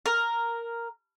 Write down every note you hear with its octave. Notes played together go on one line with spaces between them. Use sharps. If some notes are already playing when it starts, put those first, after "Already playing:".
A#4